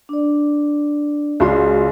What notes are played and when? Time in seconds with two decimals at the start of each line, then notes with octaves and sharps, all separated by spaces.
0.09 D4 D5
1.40 C#2 F#4 G#4 D5 C6